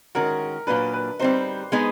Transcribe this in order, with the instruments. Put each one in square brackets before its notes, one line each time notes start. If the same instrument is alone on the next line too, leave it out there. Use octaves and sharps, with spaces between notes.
[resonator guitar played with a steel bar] D#3 G#3 C#4 F#4 [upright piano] A#4
[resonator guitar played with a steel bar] A#2 F#3 A#3 D4 [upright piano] B4
[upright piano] B4
[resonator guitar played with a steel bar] G3 C4 D#4 [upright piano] C5
[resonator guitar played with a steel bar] G#3 B3 D#4 G#4